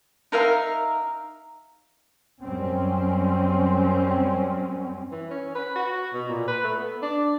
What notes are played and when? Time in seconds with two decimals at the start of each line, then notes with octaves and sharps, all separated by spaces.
0.32 D#4 A#4 E5 F5
2.42 F#2 G3 C4 C#4
5.12 E3
5.30 C#4
5.55 B4
5.76 F#4
6.14 B2
6.29 A#2
6.48 B4
6.64 A3
6.77 B3
7.02 D4